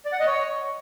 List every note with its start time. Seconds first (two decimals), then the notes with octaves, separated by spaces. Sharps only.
0.05 D5
0.13 F#5
0.20 D#5
0.27 C#5